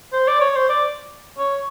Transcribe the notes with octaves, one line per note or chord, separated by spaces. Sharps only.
C5
D5
C#5
C5
D5
C#5